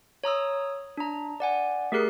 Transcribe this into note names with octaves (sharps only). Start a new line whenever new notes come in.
C#5 A#5 D#6 E6
D4 A#5
D5 F#5 G#5
A3 G4 G#4 A#4 F#6 C7